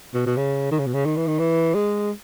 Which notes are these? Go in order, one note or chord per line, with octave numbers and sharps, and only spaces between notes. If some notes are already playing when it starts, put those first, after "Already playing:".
B2
B2
C#3
D#3
C#3
B2
C#3
D#3
E3
D#3
E3
G#3